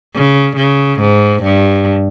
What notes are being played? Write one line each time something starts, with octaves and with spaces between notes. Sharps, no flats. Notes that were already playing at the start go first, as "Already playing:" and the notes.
C#3
C#3
G#2
G2